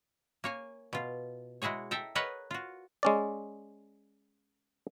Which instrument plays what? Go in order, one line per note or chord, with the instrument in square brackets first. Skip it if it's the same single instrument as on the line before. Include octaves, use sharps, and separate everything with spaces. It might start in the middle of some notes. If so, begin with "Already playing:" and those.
[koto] A#3 C#5 G#5
B2 F4
G#3 E4 F#4 G#4 C#5
A4 E5 G5 A#5
G#4 A#4 B4 C#5 D#5 F#5
F4 F#4
[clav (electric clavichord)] G#3 C#4 D5